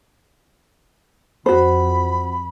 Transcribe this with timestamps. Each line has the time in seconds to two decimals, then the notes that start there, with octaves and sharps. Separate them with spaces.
1.46 F2 F#4 C5 B5